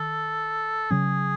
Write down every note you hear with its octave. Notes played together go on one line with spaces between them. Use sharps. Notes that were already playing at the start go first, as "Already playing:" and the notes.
Already playing: D#3 A4
C#3 F#3 C#4 G#4